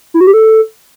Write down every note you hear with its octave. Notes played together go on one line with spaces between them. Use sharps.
E4
F#4
G4
A4